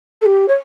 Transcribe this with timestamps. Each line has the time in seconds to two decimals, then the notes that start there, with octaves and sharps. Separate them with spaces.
0.22 A4
0.26 G4
0.48 C#5